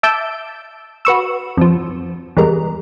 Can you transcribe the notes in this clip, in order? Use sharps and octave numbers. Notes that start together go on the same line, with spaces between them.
E5 A5 D6 E6 G6 D7
F#4 B4 C#6 E6
F2 F3
E2 G3 G#3 A#4